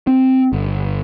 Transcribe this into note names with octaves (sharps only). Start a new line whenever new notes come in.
C4
G1